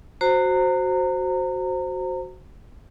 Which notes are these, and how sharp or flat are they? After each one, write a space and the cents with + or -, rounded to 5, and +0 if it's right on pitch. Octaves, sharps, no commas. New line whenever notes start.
F#4 +0 C5 +0 A#5 -30